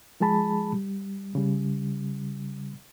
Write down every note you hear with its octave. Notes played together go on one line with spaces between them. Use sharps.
F3 G#3 G#4 A5 B5
G3
C#3 G3